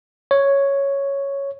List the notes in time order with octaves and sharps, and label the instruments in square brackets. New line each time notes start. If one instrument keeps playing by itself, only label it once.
[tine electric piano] C#5